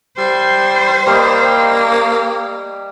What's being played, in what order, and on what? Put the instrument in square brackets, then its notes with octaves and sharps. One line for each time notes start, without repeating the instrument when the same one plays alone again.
[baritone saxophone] G3 [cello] C5
[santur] G3 G4 D#5 [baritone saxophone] A#3